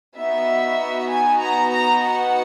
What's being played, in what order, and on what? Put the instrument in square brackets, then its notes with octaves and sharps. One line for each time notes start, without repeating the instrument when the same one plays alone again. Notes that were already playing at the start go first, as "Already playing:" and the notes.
[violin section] B3 D#4 F#4 E5
G#5
A#5
A#5
F#5